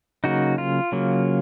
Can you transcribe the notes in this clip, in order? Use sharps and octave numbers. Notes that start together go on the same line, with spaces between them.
C#3 F#3 A#3 D#4 F#4
F4
C#3 F#3 A#3